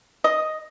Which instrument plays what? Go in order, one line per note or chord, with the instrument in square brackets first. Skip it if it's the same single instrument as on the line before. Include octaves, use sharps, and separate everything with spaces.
[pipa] D#5